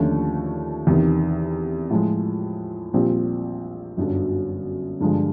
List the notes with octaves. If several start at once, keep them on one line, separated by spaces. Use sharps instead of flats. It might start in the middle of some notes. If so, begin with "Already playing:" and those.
Already playing: D#2 D3 F3 A3 C#4
E2 C3 D#3
A2 F3 G#3
A#1 A#2 G3 C4
G1 F#2 D3 F#3
G2 D3 F3 G#3